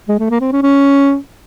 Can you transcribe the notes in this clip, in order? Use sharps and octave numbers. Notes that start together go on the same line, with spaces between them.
G#3
A3
A#3
C4
C#4
C#4